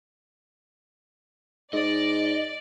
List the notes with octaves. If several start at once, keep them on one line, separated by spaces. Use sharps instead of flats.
G#2 D5 D#5